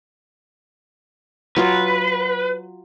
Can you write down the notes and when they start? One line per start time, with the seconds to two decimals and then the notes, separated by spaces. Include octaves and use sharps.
1.56 F#3 F4 B4 F5